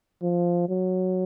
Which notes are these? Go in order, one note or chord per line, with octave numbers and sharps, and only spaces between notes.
F3
F#3